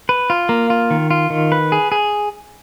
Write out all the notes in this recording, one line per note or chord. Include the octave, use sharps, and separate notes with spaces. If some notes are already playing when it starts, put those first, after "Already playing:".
B4
F4
A#3
F4
D#3
F4
D#3
B4
G#4
G#4